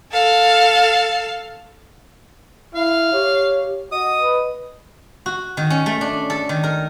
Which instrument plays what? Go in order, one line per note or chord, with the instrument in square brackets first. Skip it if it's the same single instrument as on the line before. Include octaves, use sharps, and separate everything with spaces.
[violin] A4 F5
[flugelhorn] E4 [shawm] F5
[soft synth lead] G4 [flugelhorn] C#5
[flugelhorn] F#4 [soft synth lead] D#5 [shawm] D#6
[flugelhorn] B4
[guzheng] F#4
D#3
C#4
A3
D4
A4
D#3
A#4